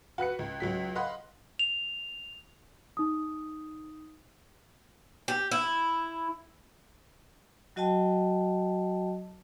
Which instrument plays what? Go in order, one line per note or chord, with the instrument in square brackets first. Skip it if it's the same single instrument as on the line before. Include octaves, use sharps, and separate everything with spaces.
[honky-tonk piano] F#4 B4 F#6 C#7
C#2
C#2 F#3 B6
D#5 F5 F#5 B5 C6 F#6
[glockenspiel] F7
[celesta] D#4 D#6
[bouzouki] G4
E4
[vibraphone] F#3 F#4 D#5 G5 A5